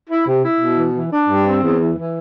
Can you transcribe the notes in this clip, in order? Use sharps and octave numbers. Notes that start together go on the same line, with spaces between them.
E4
C3
E4
B2
E3
E3
D4
G2
C4
E2
E3
E3